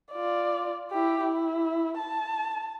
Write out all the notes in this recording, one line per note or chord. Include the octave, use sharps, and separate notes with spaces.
F4 D5
E4 G4
E4
A5